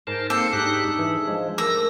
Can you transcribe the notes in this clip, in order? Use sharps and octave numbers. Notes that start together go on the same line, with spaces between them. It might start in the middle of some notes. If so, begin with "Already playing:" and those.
G#2 A#4 C5 A5
A#3 C4 A4 C5 D6
G#2 D4 D#4 G4 F#6
E3 G#4
F3 G#3
A3 A#4 E6 A#6